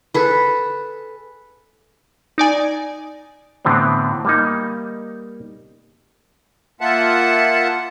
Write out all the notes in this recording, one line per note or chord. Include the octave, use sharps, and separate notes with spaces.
G#4 A4 B4
D#4 D5 G#5
A2 D3 E3 B3 C4
G3 A#3 D#4
A#3 F4 E5 F#5 A5